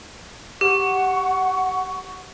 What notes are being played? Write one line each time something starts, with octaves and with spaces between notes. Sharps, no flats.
G4 F#5 C#6